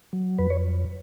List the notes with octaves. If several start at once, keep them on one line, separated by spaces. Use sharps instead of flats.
F#3
F2 B4
C#5